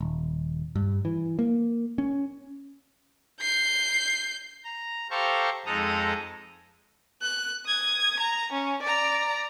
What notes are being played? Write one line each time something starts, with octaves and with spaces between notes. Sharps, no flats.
D#1
G2
E3
A#3
C#4
G6 C7
A#5
G4 A4 C5 F5 A#5 C#6
F2 G#3 D#4 A4 A#5 D#6
F#6
D#6 G#6
A#5
C#4
D5 A#5